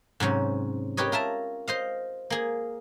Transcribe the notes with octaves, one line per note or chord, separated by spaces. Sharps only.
G#2 C3 F#3 C#4
G4 A#4 B4 C#5 D#5
F4 A#4 E5 A5
C5 D#5 F5
A#3 G#4